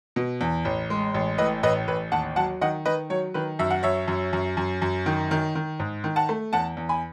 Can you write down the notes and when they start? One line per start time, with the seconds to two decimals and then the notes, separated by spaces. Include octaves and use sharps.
0.16 B2
0.41 E2
0.65 A1
0.90 G#3
1.14 A1
1.38 A2 B4 D#5
1.63 A1 B4 D#5
1.88 A1 B4
2.12 D#2 F#5 A5
2.36 F#3 F#5 A5
2.61 D#3 D#5 F#5
2.85 D#3 B4 D#5
3.10 F#3 C#5
3.34 D#3 B4
3.59 F#2 E5
3.71 F#5
3.83 F#2 C#5 E5
4.08 F#2
4.33 F#2
4.57 F#2
4.82 F#2
5.06 D#3
5.31 D#3
5.55 D#3
5.79 G#2
6.04 D#3
6.16 F#5 A5
6.29 A3
6.53 E2 F#5 A5
6.77 E2
6.89 G#5 B5